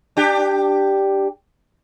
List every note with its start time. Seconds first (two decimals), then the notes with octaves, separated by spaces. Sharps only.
0.17 D4 G4